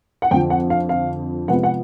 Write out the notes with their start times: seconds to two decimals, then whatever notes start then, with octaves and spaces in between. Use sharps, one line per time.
0.22 F#5
0.31 F2 D3 F3 G5
0.50 F#5
0.70 F5
0.89 F5
1.48 C3 F3 G#3 B3 F#5
1.63 F#5